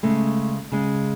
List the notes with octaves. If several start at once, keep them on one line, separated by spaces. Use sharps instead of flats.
C#3 G#3 A3
C#3 G#3